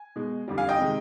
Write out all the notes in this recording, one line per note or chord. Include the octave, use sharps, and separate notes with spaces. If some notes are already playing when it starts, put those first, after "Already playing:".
Already playing: G#5
B2 G#3
F2 D3 G3
F5 G#5
D#5 G5
C3 D#3 G#3